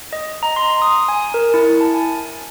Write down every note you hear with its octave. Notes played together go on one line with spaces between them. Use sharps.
D#5
A#5
C6
D#6
G#5
A#4
E4
A5
G#5